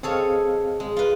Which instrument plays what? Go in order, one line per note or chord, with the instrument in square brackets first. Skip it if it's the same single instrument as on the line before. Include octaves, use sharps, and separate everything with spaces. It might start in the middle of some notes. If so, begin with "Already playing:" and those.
[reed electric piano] C4 D#5 F5 [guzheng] G#4 A4 C#5
[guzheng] G#3
F4 B4